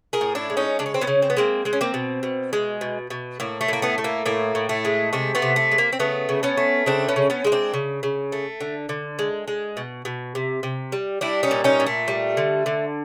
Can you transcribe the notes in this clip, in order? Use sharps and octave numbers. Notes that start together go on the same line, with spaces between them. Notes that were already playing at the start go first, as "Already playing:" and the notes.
G#4 A#4
A2
D4 E4
G#3
C#4 D#4
C#3 D4
C#4
C4
B3 C#4
C#3
C4
B3
G#3 A#3 C4
G#3 C4
C#4
A#3 C4
B2
B2
G#3
B2
B2
A2 A#3
A3
A2 A#3
A3 B3
A3
A#3
A2 A#3
A2
A3
G#3
C3 A3
A3 B3
C3
A3
G#3
A#3
C4
C#3 A3 B3
C#3
B3 C#4
A3
C#3 C4 D4
B3 C#4
C#3
B3 C#4
G#3 D#4
C4 D4
C#3
C#3
A3
D3
D3
G#3
G#3
B2
B2
C3
C3
G3
G3 D4 E4
C#4 D#4
A#2
C#4 D#4
A#2
A3
G3
D3
D3